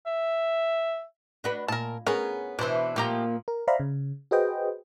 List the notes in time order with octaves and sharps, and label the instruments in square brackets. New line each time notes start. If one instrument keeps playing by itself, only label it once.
[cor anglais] E5
[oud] D4 F#4 B4
[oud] A#2 [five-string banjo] A#4 A5
[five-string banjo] B3 C#4 [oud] G#4 A#4
[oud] B2 E3 [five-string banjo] D4 C5
[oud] A#2 F3 A#3 [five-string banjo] A3 G4 A#5
[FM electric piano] A#4
C5 D5 E5 F5 A#5 B5
C#3
F#4 G#4 B4 C5 D#5 G5